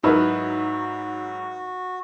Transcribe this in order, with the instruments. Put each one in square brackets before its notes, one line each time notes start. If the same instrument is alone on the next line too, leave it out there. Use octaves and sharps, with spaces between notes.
[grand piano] G#2 F#3 E4 [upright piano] D#4 A#4 B4 [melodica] F#4